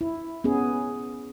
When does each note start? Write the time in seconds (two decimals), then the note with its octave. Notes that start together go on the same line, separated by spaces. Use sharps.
0.01 E4
0.44 B3 C#4 G#4